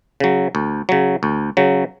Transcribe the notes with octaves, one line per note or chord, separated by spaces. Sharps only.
C#3 F#3
D2
C#3 F#3
D2
C#3 F#3